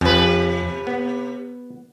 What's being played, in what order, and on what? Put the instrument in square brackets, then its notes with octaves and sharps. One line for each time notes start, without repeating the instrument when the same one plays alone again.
[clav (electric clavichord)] F2 [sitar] C3 B4
[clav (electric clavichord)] B3